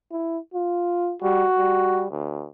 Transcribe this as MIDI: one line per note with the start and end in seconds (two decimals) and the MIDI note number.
0.11 0.38 64
0.54 1.14 65
1.22 1.44 55
1.22 2.06 66
1.58 2.08 55
2.11 2.47 38